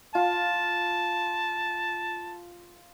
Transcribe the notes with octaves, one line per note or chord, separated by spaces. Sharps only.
F4 A5